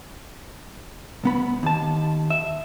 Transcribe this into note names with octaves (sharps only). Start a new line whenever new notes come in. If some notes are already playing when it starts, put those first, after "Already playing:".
C2 B3 B5
D#2 A5
E5